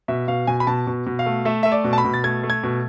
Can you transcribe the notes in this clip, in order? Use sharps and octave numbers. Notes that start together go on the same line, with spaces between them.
B2 E5
B2 F5
B2 G#5
B5
B2 A5
B2
B2
F5
A3
A3 E5
A3 E5
D5
B2
A5
B5
B2
A6
A3 G#6
A3
G#6
B2